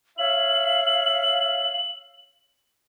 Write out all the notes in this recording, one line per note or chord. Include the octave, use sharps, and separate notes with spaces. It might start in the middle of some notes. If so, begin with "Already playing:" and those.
C#5 E5 F5 F#7